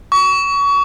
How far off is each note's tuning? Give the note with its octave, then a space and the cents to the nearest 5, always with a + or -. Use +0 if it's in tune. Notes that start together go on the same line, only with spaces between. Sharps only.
C#6 +30